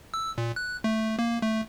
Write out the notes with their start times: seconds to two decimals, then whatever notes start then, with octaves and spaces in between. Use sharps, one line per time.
0.14 E6
0.38 A#2
0.56 F#6
0.84 A3
1.19 A#3
1.42 A3